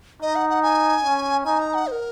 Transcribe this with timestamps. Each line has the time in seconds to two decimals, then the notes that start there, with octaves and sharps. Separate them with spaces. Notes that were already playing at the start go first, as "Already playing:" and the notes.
0.22 D#4 D#5
0.36 F#5
0.50 F#5
0.63 G#5
1.04 C#4
1.45 D#4 G#5
1.59 A#5
1.74 F#5
1.87 C5
1.92 A#4